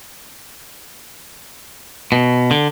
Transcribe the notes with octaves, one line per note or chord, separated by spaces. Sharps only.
B2
D3